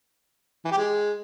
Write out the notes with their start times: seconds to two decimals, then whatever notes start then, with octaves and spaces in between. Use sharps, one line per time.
0.65 E3
0.71 G4
0.78 G#3